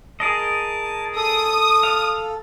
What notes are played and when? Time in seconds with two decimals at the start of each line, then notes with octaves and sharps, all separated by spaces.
0.20 G#4 A#4 D#5 A5
1.16 A4 D#6
1.83 F5